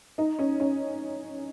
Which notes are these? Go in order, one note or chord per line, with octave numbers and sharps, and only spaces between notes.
D#4
C#4
C#4